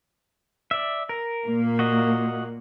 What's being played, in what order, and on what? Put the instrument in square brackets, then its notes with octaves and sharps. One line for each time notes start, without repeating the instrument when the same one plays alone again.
[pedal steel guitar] D5 E5
A#4
[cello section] A#2 A#3
[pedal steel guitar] F#4 D#5